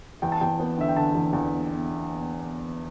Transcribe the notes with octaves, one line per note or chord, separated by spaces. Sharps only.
E2 G5
A5
E2 G5
B3
D3 E5
G5
D3 A5
E2
E2